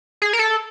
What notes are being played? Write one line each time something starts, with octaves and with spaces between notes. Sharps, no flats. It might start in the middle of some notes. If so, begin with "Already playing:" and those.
G#4
A#4
A4